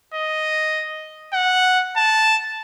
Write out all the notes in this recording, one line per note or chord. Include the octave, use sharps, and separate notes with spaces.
D#5
F#5
A5